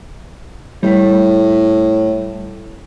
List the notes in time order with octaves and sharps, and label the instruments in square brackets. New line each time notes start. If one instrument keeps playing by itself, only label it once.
[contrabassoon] A2 [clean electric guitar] G3 A3